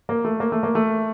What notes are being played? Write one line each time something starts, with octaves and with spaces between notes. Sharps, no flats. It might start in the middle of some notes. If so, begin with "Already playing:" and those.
A#3
A3
A#3
A3
A#3
A3